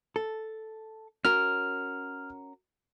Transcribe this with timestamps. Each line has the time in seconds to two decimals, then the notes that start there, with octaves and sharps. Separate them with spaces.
0.16 A4
1.25 C#4 F#4 A#4 F6